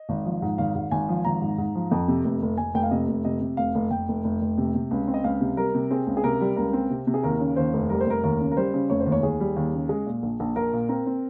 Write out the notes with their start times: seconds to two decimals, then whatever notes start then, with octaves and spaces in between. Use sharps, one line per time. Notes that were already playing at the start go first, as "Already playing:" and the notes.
Already playing: D#5
0.09 G#1
0.25 F3
0.42 G#2
0.58 G#1 F5
0.75 G#2
0.91 G#1 G#5
1.09 F3
1.25 G#1 A#5
1.41 G#2
1.58 G#2
1.75 F3
1.91 F2
2.08 C3
2.25 F1
2.42 F1
2.58 F1 G#5
2.74 F1 G5
2.83 F5
2.91 C3 D#5
3.08 F1
3.25 C3 D#5
3.41 C3
3.57 F1 F5
3.75 F1
3.91 F1 G5
4.08 F1
4.24 F1
4.42 F1
4.58 C3
4.75 C3
4.91 C#2
5.08 C4
5.14 D#5
5.24 C#2 F5
5.41 C3
5.57 G3 A#4
5.75 C3
5.91 C4 G#4
6.07 C#2
6.17 G#4
6.24 C3 A#4
6.41 G3
6.57 C#2 A#4
6.73 C4
6.90 C3
7.07 C3
7.14 G#4
7.23 D#2 A#4
7.40 C#3
7.56 D#2 C5
7.73 F1
7.89 G3 A#4
8.01 C5
8.06 F1 A#4
8.24 D#2 A#4
8.40 C#3
8.51 A#4
8.57 G3 C5
8.74 C#3
8.90 F1 C#5
9.00 C5
9.06 D#2
9.12 C#5
9.23 D#2 G#4
9.40 G3
9.56 D#2
9.74 C#3
9.89 G#3
10.06 A#2
10.23 A#1
10.40 A#1
10.56 A#1 A#4
10.73 A#2
10.89 C4 A#4
11.06 C4